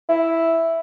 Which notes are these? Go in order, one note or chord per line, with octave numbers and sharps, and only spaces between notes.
E4